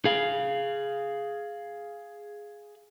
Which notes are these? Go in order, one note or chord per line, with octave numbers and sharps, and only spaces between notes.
G#4 F5